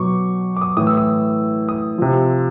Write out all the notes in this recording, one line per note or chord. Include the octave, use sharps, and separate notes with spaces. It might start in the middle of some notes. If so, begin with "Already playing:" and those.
Already playing: B2 F#3 C#6 D6
D6
D#6
A2 E3 D#6
E6
D#6
D#6
C3 F3